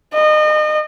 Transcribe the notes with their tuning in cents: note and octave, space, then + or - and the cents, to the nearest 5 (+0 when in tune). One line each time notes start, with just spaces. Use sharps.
D#5 -30